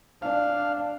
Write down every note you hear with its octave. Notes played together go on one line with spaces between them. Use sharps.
D4 F5